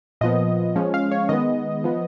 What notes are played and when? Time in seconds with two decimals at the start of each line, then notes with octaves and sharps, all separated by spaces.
0.21 A#2 F3 B3 D#5
0.76 F3 G#3 C#4
0.94 F5
1.11 C#5
1.29 D#3 G#3 B3 D#5
1.84 F3 B3